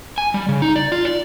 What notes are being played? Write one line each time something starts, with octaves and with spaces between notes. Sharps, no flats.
G#5
G3
C#3
D#4
D5
F4
D5